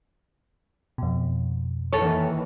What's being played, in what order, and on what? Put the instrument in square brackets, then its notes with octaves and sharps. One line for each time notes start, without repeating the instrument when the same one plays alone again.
[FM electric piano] F2 B2
[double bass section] D#2 D#3 E3 [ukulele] A4 C#5